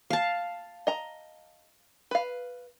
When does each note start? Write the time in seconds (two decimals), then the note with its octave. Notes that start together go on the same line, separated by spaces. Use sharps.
0.10 F5 A5
0.87 D#5 A#5
2.11 B4 F5